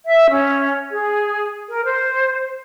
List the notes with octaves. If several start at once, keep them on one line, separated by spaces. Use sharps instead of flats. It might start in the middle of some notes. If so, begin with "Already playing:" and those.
E5
C#4
G#4
A#4
C5